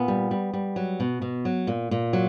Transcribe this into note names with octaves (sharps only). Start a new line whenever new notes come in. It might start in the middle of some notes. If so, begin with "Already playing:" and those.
Already playing: A#2 B3
G3
G3
G3
F#3
B2
B2
F#3
A#2
A#2
F#3